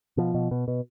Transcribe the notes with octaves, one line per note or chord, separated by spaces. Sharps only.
B2 F3
B2
B2
B2